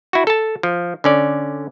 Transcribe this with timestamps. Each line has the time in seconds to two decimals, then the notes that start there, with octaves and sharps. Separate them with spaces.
0.13 E4 F#4
0.27 A4 A5
0.63 F3
1.04 D3 C#4 D5